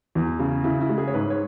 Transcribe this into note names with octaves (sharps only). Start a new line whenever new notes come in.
E2
C#3
C#3 E4
E4
G#3
G#4
C#5
G#2 B4
C#5